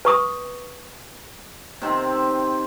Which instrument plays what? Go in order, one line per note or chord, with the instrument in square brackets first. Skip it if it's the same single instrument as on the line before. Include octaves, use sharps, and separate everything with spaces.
[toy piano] B4 C#6 D#6
[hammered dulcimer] C3 D#3 C4